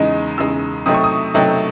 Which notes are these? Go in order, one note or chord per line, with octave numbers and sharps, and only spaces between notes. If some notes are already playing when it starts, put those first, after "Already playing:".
Already playing: E2 C#3 G#3 D#4
E2 C#3 G#3 D#4 E6
C3 F#3 A3 C4 D#4 D#6
C#6
D#6
C3 F#3 A3 C4 D#4